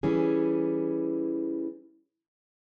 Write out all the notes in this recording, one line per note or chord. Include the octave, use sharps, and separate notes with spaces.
E3 G3 C#4 G#4